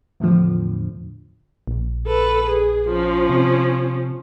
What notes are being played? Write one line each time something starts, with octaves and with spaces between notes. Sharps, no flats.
E2 A2 D3 F3
A#1
A4 B4
G#4
F3 C#4
C3